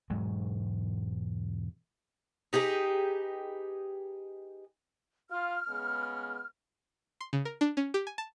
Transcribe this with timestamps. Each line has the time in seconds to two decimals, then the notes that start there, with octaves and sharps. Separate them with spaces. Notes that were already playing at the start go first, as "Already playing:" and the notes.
0.10 E1 G#2 F#3 G#3
2.53 D#4 G4 G#4 B4
5.30 F4 F6
5.68 C#3 G#3 B3
7.21 C6
7.33 C#3
7.45 A#4
7.61 D4
7.77 C#4
7.94 G4
8.07 G#5
8.18 A5